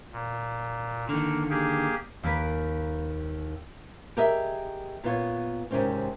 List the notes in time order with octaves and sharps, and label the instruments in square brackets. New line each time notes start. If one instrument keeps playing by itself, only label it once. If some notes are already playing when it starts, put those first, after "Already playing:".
[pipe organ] A#2
[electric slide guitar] D3 D#3 [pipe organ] A#3
[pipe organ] A#3 G4 G#4
[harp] D#2 A#3 B4 A#5 B6
[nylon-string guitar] G4 G#4 A#4 D#5 E5
A#2 B3 F4 C#5
G#2 C3 D#3 C4 C#4